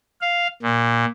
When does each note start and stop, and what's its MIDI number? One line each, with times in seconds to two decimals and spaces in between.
0.21 0.47 77
0.62 1.05 46